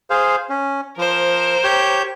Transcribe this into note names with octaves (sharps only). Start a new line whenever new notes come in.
G#4 C5 F5
C#4
F3 A#4 C5
G4 C#5 G6